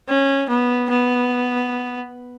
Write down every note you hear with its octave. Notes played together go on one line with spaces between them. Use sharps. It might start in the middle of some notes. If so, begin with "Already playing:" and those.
C#4
B3
B3